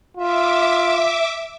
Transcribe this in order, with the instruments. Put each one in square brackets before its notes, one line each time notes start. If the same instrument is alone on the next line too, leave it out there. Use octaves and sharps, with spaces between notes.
[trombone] F4 [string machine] E5 D6